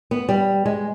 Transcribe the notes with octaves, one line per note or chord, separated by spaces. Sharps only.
B3
G3
G#3